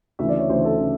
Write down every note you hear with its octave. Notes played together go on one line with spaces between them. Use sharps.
D2 C#3 E3 E5
D5
C#5
D2 C#3 E3 C5
A4
C#3 E3